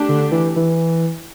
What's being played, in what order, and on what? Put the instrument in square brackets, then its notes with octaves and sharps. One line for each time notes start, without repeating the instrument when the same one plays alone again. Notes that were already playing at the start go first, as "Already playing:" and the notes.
Already playing: [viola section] A3 D4 G4
[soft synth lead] D3
E3
E3